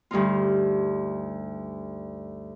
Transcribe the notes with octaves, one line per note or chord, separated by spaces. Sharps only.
D2 G2 D#4 F4